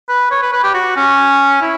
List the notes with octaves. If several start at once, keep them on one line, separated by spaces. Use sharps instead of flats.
B4
C#5
B4
B4
G4
F#4
C#4
E4